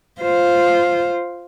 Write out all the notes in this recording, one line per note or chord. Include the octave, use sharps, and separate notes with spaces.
F4 C5